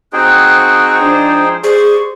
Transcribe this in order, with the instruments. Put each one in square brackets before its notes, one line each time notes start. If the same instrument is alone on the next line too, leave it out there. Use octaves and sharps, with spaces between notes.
[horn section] C4 F#4 [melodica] D#4 G#4 G5 [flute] F#6
[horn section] F3 G#3 C5 [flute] D4
[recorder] G#4 [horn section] C5 D5 [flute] C#6